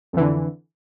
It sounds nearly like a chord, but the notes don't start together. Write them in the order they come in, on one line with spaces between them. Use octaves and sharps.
F2 E3 D3